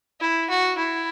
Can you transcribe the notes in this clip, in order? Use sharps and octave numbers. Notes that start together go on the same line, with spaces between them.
E4
F#4
E4